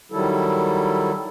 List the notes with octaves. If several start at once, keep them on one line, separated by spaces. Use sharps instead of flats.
D#3 F#3 G3 E4 A4